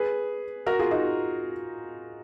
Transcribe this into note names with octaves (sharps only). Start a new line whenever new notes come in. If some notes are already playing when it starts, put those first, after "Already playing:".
Already playing: G#4 B4
F#4 A#4
F4 G#4
D#4 F#4